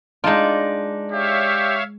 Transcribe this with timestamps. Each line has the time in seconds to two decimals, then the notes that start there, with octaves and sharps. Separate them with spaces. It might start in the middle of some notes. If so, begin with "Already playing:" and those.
0.24 G#3 D4 D#4 F4
1.12 G4 C#5 E5 F5